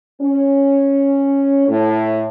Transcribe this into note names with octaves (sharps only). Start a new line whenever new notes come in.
C#4
A2